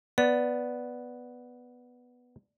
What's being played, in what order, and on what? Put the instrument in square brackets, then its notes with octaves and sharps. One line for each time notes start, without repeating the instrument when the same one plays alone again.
[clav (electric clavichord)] B3 [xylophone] D5